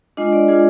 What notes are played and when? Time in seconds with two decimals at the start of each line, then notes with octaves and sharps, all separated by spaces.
0.17 G#3 D4 F4 D#5
0.33 D5
0.48 G#3 D4 F4 G#4